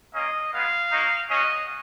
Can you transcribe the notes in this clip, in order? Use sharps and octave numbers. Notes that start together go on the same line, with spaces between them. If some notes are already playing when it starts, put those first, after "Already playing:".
A#3 C#4 F4 D#5
G#3 B3 F4 F5
A#3 D#4 F#4
G#3 C#4 F#4 D#5